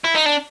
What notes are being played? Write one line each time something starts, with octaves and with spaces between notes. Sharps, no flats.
E4
D#4
D4